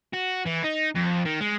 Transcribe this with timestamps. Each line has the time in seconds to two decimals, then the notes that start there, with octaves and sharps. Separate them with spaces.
0.13 F#4
0.45 E3
0.63 D#4
0.95 F2
1.25 D#3
1.41 G#3